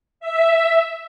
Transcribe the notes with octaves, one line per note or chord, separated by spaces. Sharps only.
E5